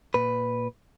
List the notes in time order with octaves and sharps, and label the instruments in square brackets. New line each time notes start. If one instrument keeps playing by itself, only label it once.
[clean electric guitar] A#2 B4